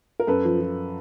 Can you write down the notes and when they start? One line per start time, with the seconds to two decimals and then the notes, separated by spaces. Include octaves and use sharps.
0.20 A#4
0.27 F#2 A4 B4
0.45 F3
0.60 F3